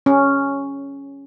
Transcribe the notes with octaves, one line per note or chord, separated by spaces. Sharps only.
C#4